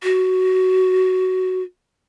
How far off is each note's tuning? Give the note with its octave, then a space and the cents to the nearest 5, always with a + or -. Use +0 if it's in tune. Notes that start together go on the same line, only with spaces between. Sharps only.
F#4 +10